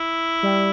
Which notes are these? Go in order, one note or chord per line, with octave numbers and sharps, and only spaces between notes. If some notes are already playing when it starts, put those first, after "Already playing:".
Already playing: E4
G3